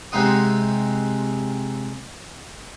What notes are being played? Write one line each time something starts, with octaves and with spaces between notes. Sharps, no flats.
C3 G#3 D#4 C5 F#5 D#6